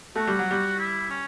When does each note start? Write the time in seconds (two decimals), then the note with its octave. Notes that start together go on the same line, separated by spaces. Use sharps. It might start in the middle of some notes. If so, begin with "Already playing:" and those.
0.16 A3 F#4
0.27 G3
0.39 F#3
0.51 G3
0.78 E4
1.10 C#4